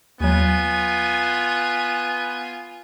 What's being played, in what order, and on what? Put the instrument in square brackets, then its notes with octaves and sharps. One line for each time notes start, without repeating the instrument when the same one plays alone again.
[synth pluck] D#2 F#3 [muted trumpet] B3 [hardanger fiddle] F4 G#5